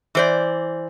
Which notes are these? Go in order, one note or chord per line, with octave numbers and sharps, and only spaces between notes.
E3 C5 D5